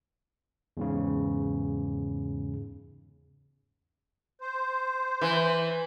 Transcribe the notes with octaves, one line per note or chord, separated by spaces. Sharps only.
E2 G#2 C#3
C5
E3